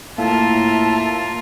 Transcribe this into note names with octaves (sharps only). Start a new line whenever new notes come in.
A2 A#3 F4 A#4 E5 A5